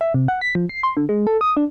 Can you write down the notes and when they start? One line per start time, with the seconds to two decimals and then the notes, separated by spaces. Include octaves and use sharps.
0.01 E5
0.14 C3
0.28 F#5
0.41 B6
0.55 F3
0.69 C7
0.83 C6
0.97 D3
1.09 G#3
1.27 A4
1.41 D#6
1.57 D4